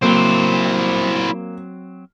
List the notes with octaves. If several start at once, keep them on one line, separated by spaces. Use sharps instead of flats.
F#3 A#3 C4 E4 C5